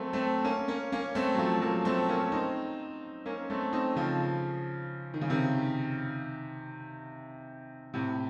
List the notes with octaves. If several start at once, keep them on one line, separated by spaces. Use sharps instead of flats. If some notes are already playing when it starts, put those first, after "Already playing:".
Already playing: F#3 A3 A#3 C4
A3 C4
A#3 C#4
A#3 C#4
A#3 C#4
A3 C4
F#3
F3 A3
F#3 A#3
A3 C4
A#3 C#4
C4 D#4
A#3 C#4
A3 C4
C4 D#4
C#3 F3
D#3
C#3
C3 D#3
A2 C3